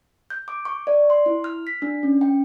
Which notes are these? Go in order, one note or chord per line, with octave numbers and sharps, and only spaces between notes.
G6
D6
C#6
D5
C6
E4
F6
B6
D4
C#4
G5